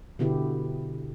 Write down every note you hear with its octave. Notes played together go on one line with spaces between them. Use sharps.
B2 D3 B3 E4 G4